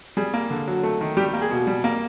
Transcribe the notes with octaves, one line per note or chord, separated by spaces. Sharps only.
G3 G#4
A#3
D3
F#3
A3
D#3
G3 G4
A#3
G#4
B2
G3
A#3